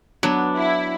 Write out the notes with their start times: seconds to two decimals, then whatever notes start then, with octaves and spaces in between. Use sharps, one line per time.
0.23 F#3 B3 D4
0.58 E4